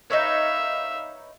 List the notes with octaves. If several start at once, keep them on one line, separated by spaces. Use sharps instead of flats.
D#4 B4 C#5 E5 F5